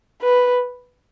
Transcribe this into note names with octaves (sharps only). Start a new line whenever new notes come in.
B4